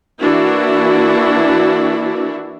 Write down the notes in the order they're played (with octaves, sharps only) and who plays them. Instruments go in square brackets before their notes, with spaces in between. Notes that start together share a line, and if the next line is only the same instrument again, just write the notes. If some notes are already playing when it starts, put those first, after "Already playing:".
[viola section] E3 A#3 D4 E4 F#4